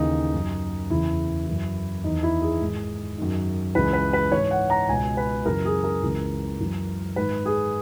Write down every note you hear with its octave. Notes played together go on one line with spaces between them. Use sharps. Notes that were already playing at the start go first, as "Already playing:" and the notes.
Already playing: D#2 C#3 E3 D#4
F#2 D#3
E2 C#3 E3 E4
F#2 E3
E2 D#3 D#4
E4
G#4
G#2 D#3
F#2 D#3
C#2 C#3 E3 B4
B4
B4
G#2 E3 C#5
F#5
A#5
C#2 B2 G#5
B4
F#2 C#3 E3 A#4
G#4
A#4
C#2 C#3 E3
F#2 E3
G#2 D#3 B4
G#4